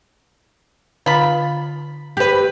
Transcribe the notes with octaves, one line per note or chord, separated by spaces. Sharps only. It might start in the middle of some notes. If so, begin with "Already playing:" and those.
D3 F4 A5 B5
G4 B4